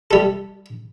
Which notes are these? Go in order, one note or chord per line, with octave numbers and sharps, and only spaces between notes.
G3 A4